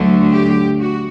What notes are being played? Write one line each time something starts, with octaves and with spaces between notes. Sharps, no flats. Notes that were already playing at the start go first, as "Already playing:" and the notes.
Already playing: D2 D3 F#3 A3
G4
F#4